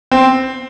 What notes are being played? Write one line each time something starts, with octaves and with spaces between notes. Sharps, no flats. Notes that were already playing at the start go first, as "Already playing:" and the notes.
C4